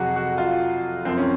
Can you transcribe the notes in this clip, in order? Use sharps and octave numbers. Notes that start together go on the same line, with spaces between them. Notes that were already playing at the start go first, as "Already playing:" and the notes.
Already playing: F2 C3 F#3 F#4 G#4
F#4
F4
F#2 F3 C4
C#4